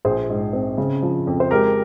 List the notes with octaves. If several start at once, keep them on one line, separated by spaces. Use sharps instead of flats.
A#1 G#4 C5
G#2
C4
C#3
F3
F2
C5
G#3 G4 A#4